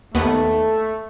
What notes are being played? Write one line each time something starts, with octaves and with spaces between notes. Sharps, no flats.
D#2 A3 B3